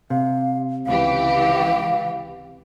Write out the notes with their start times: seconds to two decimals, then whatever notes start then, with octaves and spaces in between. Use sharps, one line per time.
0.10 C3 F5
0.86 C#2 E3 G4 F5